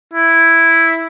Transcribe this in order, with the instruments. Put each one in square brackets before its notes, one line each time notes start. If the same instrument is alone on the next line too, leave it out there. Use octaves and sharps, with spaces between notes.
[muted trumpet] E4